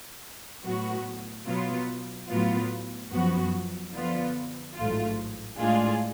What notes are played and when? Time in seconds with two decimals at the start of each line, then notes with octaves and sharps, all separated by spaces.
0.65 A2 F#3 B3 F#4
1.47 B2 F#3 B3 F4
2.30 A2 F#3 B3 F4
3.12 F#2 F3 B3 F#4
3.94 D3 F3 B3 F4
4.77 A1 G#2 F#3 A3 F4
5.59 A2 G#3 D4 F4 G#4